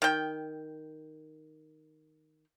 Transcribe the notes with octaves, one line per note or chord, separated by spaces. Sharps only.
D#3 G5